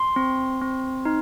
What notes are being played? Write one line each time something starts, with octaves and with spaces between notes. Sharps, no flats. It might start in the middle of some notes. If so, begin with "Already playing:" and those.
Already playing: C6
C4
C4
D#4